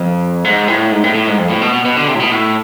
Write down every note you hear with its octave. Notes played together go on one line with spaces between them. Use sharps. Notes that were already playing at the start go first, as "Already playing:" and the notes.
Already playing: F2
G#2
A2
G#2
A2
A2
G#2
F2
A2
B2
B2
B2
D3
C3
A2
B2
A2